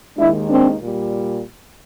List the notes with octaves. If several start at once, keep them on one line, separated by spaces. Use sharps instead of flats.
D#2 D#3 G#3 D4 E4
C4 D4
A#2 G3